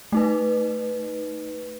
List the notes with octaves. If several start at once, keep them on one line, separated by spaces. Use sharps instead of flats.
A3 D#4 B4